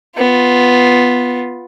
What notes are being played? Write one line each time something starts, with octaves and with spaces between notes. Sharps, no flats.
B3 F4